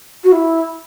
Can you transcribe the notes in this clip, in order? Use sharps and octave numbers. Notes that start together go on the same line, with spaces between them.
F#4
E4